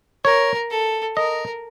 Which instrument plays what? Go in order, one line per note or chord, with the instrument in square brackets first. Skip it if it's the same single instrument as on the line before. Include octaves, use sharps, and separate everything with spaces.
[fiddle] A#4 [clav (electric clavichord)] C#5
[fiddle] A4
[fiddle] A#4 [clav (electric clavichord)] D#5